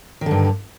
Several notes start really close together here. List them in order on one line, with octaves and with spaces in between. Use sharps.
D#3 D3 G2